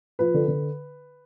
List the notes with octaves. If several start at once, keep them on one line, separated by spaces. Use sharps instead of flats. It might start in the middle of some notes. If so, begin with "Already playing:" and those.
F3 B4
D3
D3